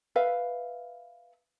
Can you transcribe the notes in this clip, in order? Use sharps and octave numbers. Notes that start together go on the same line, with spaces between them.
B4 E5 F5